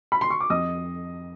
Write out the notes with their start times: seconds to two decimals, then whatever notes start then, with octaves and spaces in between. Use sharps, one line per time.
0.12 B5
0.21 C6
0.30 C#6
0.40 D6
0.50 F2 D#5 D#6